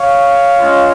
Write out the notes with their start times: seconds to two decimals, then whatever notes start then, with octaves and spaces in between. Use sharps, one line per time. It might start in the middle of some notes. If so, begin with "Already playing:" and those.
Already playing: C#5 F5
0.60 G#3 C#4 F4